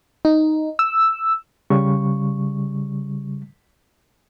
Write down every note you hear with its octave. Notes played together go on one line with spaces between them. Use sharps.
D#4
E6
C#3 G3 C#6